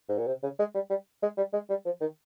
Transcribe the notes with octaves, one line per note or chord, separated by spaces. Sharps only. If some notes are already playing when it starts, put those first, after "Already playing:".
G#2
A#2
C3
C#3
G#3
G3
G3
G#3
G3
G#3
G3
F3
D#3